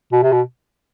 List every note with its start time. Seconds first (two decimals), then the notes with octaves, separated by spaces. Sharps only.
0.12 B2
0.23 C3
0.32 B2